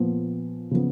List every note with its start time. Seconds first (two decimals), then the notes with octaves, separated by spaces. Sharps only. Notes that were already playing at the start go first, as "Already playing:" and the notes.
Already playing: A#2 F3 B3
0.71 C#3 F3 B3